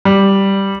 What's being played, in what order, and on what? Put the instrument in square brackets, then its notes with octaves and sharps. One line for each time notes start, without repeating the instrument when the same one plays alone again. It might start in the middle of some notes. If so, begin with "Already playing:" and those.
[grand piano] G3